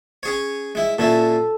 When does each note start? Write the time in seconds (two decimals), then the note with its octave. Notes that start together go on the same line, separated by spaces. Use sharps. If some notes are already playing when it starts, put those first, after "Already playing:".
0.23 C#4 G#4 C#5
0.75 G#3 E4
0.98 A#2 C#4 E4 A4